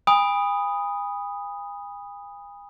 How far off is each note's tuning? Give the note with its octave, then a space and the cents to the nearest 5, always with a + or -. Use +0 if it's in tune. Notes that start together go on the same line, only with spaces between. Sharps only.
G#5 -40 B5 +0 D#6 +0